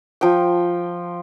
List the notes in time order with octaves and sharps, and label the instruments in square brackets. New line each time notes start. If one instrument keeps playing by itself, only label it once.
[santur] F3 G5